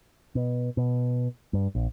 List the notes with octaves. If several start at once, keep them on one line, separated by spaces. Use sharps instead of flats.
B2
B2
G2
A#1